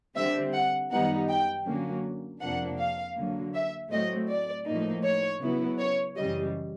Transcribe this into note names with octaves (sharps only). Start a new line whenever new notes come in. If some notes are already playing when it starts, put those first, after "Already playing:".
D3 G3 C4 E5
F#5
F#2 D#3 G3 B3 D#4 F#5
G5
D3 F#3 A#3 C#4
F2 C3 F3 A#3 D4 F#5
F5
D3 F#3 A#3
E5
A2 F#3 A3 C4 D#5
D5
A2 F3 A#3 D#4
C#5
C#3 F#3 B3 E4
C#5
F#2 C#3 E3 G3 D#5